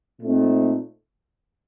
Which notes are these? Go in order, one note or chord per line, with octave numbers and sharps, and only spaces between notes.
A#2 A3 C4 D#4